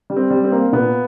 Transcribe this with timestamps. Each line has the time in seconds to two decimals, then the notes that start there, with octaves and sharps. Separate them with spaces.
0.10 G3
0.16 C4
0.30 G3
0.44 C4
0.52 A#3
0.72 A#2 B3